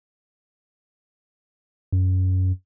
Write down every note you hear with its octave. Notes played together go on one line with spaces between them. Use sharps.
F#2